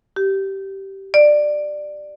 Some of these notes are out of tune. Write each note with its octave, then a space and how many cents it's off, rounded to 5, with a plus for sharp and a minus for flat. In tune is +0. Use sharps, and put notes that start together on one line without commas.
G4 -15
D5 +15